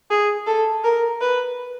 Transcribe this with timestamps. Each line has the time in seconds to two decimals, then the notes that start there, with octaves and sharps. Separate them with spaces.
0.11 G#4
0.47 A4
0.84 A#4
1.21 B4